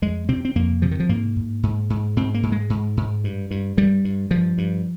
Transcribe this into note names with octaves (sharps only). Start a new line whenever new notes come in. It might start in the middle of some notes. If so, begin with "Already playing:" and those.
F2 G#3
C3 C4
C4
F2 A#3
C3 F3
D#3
F3
G#2 A#3
G#2
G#2
G#2
G#2 C4
A#3
G#2
G#3
G#2
G#2
G2
G2
G2 G3
G2
G2 F3
G2